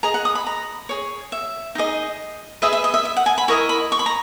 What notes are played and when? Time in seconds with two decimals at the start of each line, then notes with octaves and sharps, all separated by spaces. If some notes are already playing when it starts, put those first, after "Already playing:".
0.03 G#4 D#5 A#5
0.14 F#5
0.25 D#6
0.35 B5
0.47 A#5
0.89 G#4 C#5
1.32 E5
1.75 D#4 G#4 D#5
2.62 G#4 B4 D#5 E5
2.73 E5
2.84 D#5
2.94 E5
3.05 E5
3.16 F#5
3.26 G#5
3.38 B5
3.48 E4 A#4 D#5 C#6
3.69 B5
3.92 C#6
3.99 B5
4.06 A#5